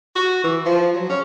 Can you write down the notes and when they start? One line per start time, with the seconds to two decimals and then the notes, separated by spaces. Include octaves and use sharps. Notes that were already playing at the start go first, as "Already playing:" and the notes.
0.16 F#4
0.44 E3
0.66 F3
0.93 F#3
1.09 C#4